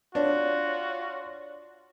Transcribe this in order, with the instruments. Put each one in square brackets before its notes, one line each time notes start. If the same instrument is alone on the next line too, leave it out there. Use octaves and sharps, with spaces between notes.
[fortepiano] D4 [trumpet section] F4 F#4 [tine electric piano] C#5